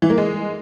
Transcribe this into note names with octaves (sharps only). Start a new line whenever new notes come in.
E3
A#3
G#3